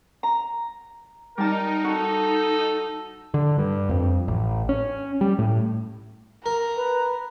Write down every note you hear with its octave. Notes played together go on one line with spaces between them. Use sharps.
A#5
G3 D#4 A#4 A5
F#4 A4
D3
G2
F2
A1
C#4
G3
A2
A#4 A#5
B4